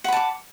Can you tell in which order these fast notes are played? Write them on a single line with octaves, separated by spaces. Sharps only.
F#5 B5 A5 D6